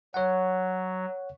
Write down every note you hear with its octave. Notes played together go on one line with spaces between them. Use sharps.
F#3 C#5 F#5